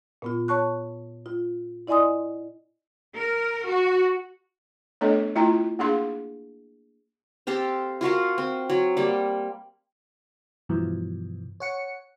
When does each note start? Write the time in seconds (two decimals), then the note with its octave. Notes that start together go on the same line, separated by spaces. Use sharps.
0.22 A#2 B3 F4
0.48 C#5 A5 C#6 F#6
1.26 F4
1.87 E4 D5 D#5 G#5 C6 D#6
3.17 A#4
3.69 F#4
5.01 A3 B3 D4 A4 C#5 D#5
5.35 A3 E4 F4 G5 A#5
5.79 A#3 D4 G#4 F5 C6
7.47 C4 G4 A4 F5
8.01 F4 F#4 A#4 F5
8.38 C4
8.70 F#3
8.97 G3 A#3
10.69 G2 B2 E3 F3
11.60 C#5 F#5 C#7